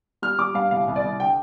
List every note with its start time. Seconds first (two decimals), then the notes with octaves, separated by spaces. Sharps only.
0.22 G3 F6
0.39 G3 D6
0.54 G2 F5
0.71 C2 F5
0.88 C2
0.96 D5
1.04 C2
1.20 D3 G5